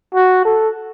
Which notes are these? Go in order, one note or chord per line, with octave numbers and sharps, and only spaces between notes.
F#4
A4